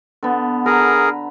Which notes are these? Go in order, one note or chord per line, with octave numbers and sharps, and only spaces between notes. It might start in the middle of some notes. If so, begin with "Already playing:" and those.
D3 B3
G#4 A#4 B4 A#5